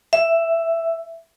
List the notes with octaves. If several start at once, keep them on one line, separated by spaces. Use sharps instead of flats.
E5